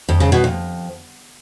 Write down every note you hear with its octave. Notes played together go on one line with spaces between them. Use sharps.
F2
C#3
B2
F2